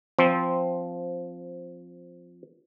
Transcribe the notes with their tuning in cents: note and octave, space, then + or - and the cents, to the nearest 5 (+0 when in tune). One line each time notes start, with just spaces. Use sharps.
F3 +0 C4 +0